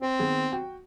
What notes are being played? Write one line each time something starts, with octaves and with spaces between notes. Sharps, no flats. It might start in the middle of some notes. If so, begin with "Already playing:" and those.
C4 C5
D#3 B3 G#4
F#4 G5